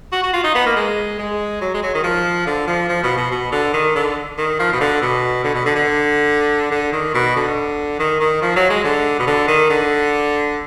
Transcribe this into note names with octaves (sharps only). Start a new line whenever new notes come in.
F#4
F#4
F4
D#4
B3
A#3
G#3
G#3
F#3
G#3
F#3
D#3
F3
D3
F3
F3
B2
B2
B2
D3
D#3
D3
D#3
F3
B2
D3
B2
D3
B2
D3
D3
D3
D#3
B2
D3
D#3
D#3
F3
F#3
G#3
D3
B2
D3
D#3
D3